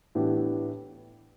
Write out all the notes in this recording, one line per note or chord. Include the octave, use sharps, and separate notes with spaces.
A2 E3 B3 D4 G4